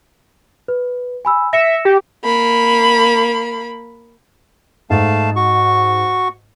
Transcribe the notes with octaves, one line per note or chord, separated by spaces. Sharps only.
B4
G#5 B5 E6
E5 A#6 C#7 E7
G4
A#3 B5
G#2 A3 F5 A5
F#4 C#6